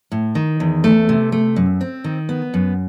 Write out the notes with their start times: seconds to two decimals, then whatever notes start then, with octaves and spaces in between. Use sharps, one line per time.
0.12 A2
0.35 D#3
0.60 E2
0.84 A3
1.09 C3
1.32 A3
1.56 F#2
1.81 C4
2.04 D#3
2.29 B3
2.54 F#2